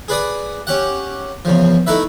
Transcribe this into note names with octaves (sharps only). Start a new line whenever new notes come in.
G#4 B4 D5 D#6
C#4 G4 F#5
E2 C#3 F3
A3 D#4 E4 B4 E5